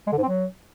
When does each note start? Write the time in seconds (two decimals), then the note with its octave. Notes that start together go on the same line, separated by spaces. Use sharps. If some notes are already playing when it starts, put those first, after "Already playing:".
0.07 G#3
0.12 D3
0.18 G#2
0.23 C4
0.28 F#3